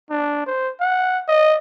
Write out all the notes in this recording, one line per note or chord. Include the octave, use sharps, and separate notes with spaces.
D4
C5
F#5
D#5